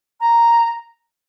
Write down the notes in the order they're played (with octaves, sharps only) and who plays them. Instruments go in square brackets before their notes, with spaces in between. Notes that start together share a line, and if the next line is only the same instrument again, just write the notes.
[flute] A#5